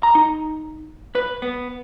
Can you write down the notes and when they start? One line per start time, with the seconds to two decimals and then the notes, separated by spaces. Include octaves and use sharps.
0.03 A#5
0.15 D#4
1.15 B4
1.42 B3